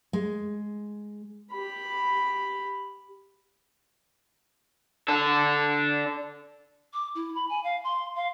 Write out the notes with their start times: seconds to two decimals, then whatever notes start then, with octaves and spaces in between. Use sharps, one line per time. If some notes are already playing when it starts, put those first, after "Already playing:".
0.13 G#3
1.52 G4 B5
5.09 D4 A4
6.93 D6
7.15 E4
7.35 B5
7.49 G#5
7.63 F5
7.84 C6
8.15 F5